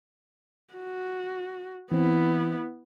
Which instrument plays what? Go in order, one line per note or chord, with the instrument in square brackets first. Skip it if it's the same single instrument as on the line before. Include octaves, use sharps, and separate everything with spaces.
[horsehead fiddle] F#4
[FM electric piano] E3 C4 [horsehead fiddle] B3 E4